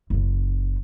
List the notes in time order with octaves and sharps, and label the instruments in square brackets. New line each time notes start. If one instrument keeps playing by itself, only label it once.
[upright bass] F#1 C#3